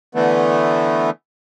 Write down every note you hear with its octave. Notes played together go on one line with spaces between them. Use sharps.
D3 E3 A3 B3